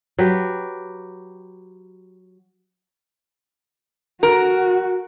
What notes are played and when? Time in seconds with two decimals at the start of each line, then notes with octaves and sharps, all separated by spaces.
0.19 F#3 G4 B4
4.23 F#4 A#4